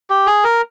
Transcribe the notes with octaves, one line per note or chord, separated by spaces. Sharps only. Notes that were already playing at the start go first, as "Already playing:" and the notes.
G4
G#4
A#4